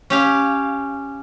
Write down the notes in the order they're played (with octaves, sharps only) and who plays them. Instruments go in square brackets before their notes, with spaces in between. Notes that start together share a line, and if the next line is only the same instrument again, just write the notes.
[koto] C#4 G4 F5